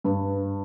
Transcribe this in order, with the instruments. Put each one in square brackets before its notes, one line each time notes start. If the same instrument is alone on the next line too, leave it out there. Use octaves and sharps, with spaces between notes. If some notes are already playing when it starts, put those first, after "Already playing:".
[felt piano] G2 B4